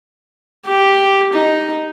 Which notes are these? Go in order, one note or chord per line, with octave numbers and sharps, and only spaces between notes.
G4
D#4